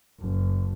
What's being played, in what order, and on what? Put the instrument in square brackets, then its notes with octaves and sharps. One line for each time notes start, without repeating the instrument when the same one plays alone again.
[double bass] F#1